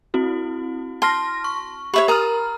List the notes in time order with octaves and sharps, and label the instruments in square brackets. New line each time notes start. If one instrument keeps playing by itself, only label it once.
[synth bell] C4 E4 F#4
[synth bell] A5 F6 A#6 [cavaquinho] C6
[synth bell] C#6
[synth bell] G4 B5 F#7 [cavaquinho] C#5 E5 C#6
[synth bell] A#4 F6 [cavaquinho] A#5 D#6